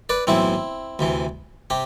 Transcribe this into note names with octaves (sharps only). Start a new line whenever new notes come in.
B4 D5
B1 A2 E3 C4 E4
D2 C3 E3
C3 G4